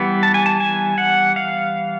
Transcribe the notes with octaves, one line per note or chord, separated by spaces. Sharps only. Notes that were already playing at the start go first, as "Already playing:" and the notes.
Already playing: E3 G3 B3
A5
G#5
A5
G#5
F#5
F5